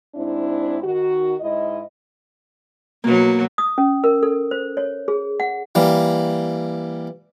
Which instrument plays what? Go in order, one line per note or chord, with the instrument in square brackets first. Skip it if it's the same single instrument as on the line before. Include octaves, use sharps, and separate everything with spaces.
[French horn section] G#2 C4 D4 E4
D#3 F#4
G#2 E4 D#5
[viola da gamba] B2 F#3 [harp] A#3
[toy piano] D#6
C#4
A#4
A4
C5
C#5
G#4
F#5
[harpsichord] E3 G3 A#3